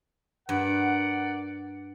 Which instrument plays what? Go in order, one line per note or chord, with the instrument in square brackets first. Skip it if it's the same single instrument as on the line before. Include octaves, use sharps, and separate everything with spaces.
[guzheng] G2 [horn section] A#4 D5 F#5